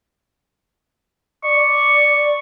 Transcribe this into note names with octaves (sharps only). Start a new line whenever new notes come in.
D5 C#6